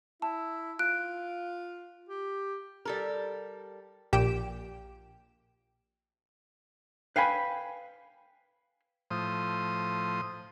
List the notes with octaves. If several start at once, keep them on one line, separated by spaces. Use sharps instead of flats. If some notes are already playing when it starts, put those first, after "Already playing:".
E4 A5
F4 F#6 D7
G4
G3 A4 A#4
A#1 A#2 G4 G5 D7 E7
B4 F5 G5 G#5 B5
A2 F3 C5 D#6